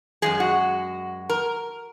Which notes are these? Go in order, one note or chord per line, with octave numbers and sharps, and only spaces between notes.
F#2 F3 G#3 G#4
F#4
A#4